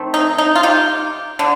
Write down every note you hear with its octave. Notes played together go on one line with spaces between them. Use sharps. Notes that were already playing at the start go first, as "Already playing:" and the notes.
Already playing: D#3 A3 C4
D#4
D#4
F4
D#4 G4
D3